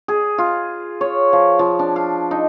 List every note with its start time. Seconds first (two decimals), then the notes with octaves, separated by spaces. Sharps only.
0.08 G#4
0.38 F4
1.01 C#5
1.33 F3
1.59 F3
1.79 D4
1.96 F5
2.31 D#4